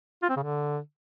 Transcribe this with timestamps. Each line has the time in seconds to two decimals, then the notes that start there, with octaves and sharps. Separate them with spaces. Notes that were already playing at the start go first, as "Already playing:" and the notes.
0.22 F4
0.29 C4
0.36 C#3
0.43 D3